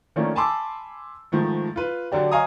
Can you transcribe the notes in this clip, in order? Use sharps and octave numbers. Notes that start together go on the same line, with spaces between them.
D#3 F3 A3 A#3 C#4 D4
G#5 A5 B5 C6 D6 E6
G#2 D#3 F3 A3
F4 B4
D3 F#3 D4 G4
C#5 D#5 F5 G#5 A#5 D#6